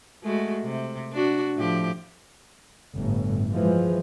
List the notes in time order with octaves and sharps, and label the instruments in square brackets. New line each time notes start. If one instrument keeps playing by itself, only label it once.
[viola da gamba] G#3 A3 F#4
C3
D4 F#4
A2 F3 G4
[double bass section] G1 A2
E3 F3 G#3